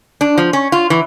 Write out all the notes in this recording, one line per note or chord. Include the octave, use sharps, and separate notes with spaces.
D4
F3
C#4
F4
E3